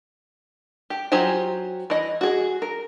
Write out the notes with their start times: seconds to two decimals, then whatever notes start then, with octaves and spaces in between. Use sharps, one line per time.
0.90 G4
1.12 F#3 F4 G4 C5 G#5
1.90 E3 D#5
2.21 F#4 G#4
2.62 A#4